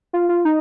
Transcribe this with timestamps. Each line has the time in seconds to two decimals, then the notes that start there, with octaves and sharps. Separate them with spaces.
0.13 F4
0.29 F4
0.45 D#4